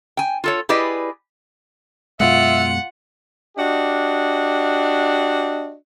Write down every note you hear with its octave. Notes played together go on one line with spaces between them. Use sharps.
G5 G#5
F4 A4 C#5
E4 G4 G#4 B4 D5 D#5
F#2 B2 G#3 F4 E5 F#5
D4 F#4 G4 D#5